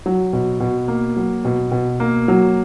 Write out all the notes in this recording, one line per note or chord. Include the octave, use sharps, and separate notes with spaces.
F#3
B2
B2
A#3
F#3
B2
B2
A#3
F#3